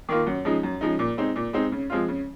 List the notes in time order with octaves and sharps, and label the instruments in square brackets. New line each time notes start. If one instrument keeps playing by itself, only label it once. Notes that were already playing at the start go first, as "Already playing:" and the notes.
[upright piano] D#3 A#3 F4
F#2
C#3 F3 G#3 D#4
F#2
C#3 F3 G#3 D#4
A#2
G#3 C4 D#4
A#2
G#3 C4 D#4
C#3
F3 G#3 C4 F4
C#3